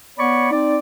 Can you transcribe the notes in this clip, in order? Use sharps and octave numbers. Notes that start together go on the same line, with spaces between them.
B3 C#5 D5 B5 C#6
C4 D#4 D5